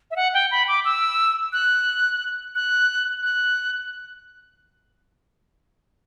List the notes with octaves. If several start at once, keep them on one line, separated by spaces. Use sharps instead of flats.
E5
F#5
G5
B5
D6
E6
F#6
F#6
F#6